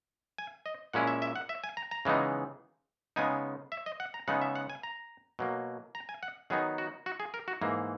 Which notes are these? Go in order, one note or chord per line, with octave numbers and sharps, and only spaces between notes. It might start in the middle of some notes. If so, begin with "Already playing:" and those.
G#5
D#5
A#2 G#3 C#4 E4 F#5
E5
E5
F#5
E5
G#5
A#5
A#5
C#3 E3 G#3 B3 D#4
C#3 G#3 B3 D#4 G#5
E5
D#5
F#5
A#5
C#3 G#3 B3 D#4 F#5
E5
F#5
G#5
A#5
B2 F#3 A#3
A#5
G#5
F#5
D#3 F#3 B3 D#4 G#4
F#4
F#4
G#4
A#4
F#4
G#2 E3 A#3